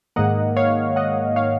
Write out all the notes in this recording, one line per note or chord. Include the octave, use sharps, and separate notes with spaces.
G#2 D#3 A#3 D#5 F#5
C#5 F5
D#5 F#5
C#5 F5